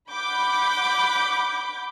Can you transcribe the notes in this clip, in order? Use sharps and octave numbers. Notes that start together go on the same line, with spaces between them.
F#5 B5 D6 G6